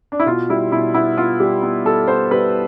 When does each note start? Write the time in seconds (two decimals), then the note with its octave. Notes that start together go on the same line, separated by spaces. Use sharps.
0.12 D4
0.20 E4
0.26 B2 F4
0.50 G3 E4
0.72 B2 E4
0.94 B3 E4
1.18 B3 F4
1.40 G3 G4
1.62 B3
1.85 G3 A4
2.08 B3 C5
2.31 G3 B4